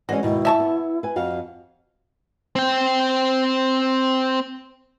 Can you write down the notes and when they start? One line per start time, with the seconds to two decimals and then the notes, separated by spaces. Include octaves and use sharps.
0.09 E3 G#3 C#4 F#4 D5
0.23 D#2 G#2 B2 E4
0.45 E5 A5 C#6
0.60 B3
1.03 B4 G#5
1.16 F2 F#4 F5
2.56 C4 G5